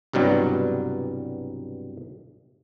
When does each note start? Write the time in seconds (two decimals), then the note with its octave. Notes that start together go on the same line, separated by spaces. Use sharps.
0.13 C2 G2 B2 F#3 G3